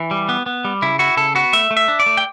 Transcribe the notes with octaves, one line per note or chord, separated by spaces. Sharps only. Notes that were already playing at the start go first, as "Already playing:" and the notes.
Already playing: E3
G3
B3
B3
G3
C#3 E4
E4 F#4
C#3 A4
B3 F#4
A3 E5
A3
E5
D4
D5
A3
G5